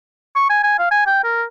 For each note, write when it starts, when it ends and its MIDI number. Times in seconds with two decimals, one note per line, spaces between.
0.36 0.47 85
0.50 0.63 80
0.63 0.78 80
0.79 0.88 77
0.91 1.02 80
1.07 1.20 79
1.24 1.44 70